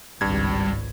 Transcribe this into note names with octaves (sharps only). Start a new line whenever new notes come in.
G#1 C#2 G2 G3 G#6